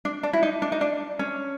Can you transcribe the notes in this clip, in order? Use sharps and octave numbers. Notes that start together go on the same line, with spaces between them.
D4
D4
E4
D#4
D4
D#4
D4
C#4